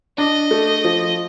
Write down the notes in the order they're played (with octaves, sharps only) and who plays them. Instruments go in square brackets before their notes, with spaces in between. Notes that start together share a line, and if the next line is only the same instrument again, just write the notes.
[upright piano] D4 [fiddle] D#5
[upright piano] A3
F3